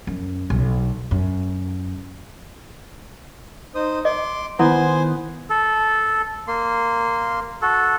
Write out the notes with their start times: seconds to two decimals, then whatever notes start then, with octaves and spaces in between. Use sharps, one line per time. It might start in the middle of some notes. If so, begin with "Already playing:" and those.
0.07 F#2
0.50 B1
1.11 F#2
3.75 D#4 C5 D#6
4.05 D#5 C6 D6
4.59 D#3 B3 E4 C5 G#5 C6
5.50 A4
6.48 A#3 C6
7.62 F#4 A4